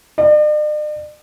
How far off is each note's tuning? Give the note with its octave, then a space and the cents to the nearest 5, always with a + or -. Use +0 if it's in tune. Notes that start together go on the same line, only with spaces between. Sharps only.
D5 +45